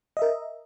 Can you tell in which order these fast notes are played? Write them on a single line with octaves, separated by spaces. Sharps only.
D#5 E5 A#4